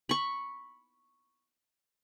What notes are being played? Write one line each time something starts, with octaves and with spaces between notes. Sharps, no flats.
B5 C#6